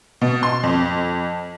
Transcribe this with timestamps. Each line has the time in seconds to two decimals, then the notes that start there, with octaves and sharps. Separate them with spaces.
0.21 B2
0.43 C6
0.63 F2